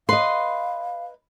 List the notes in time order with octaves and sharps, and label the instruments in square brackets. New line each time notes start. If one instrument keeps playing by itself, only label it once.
[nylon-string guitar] B4 D#5 [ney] F5 [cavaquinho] C6